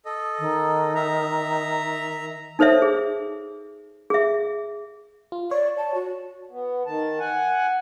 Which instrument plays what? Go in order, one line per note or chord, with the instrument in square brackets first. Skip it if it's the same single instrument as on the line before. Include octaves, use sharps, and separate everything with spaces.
[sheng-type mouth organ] A4 D#5
[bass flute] D#3
[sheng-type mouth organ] E5 A#5
[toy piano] D#4 A4 C5 C#5 E5
G#4
G#4 E5
[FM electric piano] F4
[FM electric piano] C#5 [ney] D5
[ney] A5
F#4
[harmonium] B3
D#3 A5
F#5 G#5